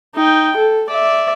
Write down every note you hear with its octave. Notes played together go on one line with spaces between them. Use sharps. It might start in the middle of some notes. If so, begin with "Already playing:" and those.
D#4 G5
A4
D5 E5